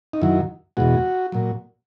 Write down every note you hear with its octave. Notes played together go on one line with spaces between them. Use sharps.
D#4
F#2 D#3 F#3 E4
E2 B2 G#3 F#4
A#2 F#3